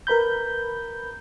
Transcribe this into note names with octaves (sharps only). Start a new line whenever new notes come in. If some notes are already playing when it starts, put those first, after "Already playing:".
A#4 B4 B5 G6